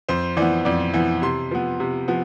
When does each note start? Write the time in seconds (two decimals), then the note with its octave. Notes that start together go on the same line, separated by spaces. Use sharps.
0.09 F2 C5
0.37 E3 B3 D5
0.65 F2 D5
0.94 E3 B3
1.22 C3 C6
1.51 F3 B3
1.80 C3
2.08 F3 B3